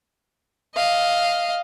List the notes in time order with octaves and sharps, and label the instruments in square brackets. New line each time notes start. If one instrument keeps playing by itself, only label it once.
[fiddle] D#5 F5